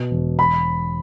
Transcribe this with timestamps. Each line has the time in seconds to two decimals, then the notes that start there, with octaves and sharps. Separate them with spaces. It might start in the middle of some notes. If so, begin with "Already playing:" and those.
Already playing: B2
0.11 E1
0.39 B5